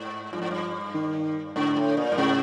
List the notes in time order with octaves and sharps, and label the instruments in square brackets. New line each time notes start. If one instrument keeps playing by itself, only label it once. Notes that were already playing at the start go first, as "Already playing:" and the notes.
Already playing: [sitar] G#2
[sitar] G2 [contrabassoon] F3
[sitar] G#2
G2
[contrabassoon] D#3
[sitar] G#2 [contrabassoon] D3
[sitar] A2
A#2
G2
[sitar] G#2 [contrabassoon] C#3